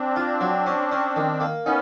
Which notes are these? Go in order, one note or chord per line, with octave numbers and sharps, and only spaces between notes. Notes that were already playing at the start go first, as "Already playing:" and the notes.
Already playing: C4 D4
F4
F#3
C#4
C#4
D#3
A#3
B3 C#4 D#4